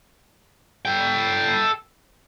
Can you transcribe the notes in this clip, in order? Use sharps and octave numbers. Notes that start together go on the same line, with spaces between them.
A4 G5